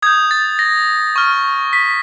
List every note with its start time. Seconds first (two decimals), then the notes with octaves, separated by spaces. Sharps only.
0.02 D#6 G6 G#6
0.31 A6
0.59 A#6
1.16 C#6 F6
1.73 B6